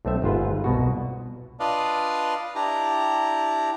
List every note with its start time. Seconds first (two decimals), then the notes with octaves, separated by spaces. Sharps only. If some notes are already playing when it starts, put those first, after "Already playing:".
0.05 B1 A3 C4 E5
0.22 G1 G#2 F4 B4
0.64 C2 B2 F#4
1.60 D4 F4 B4 D5 D#5 F5
2.55 D4 E4 G4 A#5